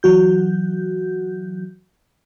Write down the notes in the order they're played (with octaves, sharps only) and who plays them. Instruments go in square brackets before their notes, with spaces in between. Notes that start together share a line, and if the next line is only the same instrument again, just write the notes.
[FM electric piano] E3 F#3 F#4 G6